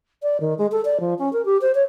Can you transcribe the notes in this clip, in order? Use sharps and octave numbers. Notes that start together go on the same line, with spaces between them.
D5
D#3
G#3
A4
D5
F3
C#4
A#4
G4
C5
C#5